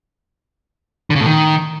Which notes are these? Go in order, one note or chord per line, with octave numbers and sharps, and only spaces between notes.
D3
C#3
A2
D#3